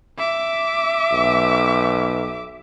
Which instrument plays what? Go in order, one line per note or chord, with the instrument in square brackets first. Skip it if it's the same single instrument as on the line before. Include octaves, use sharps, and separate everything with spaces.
[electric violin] E5 D6
[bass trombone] B1